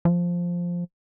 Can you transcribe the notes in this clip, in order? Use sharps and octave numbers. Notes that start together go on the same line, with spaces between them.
F3